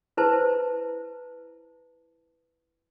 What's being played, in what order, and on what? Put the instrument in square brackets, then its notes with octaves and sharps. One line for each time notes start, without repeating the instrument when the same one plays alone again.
[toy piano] E4 B4 C5 A5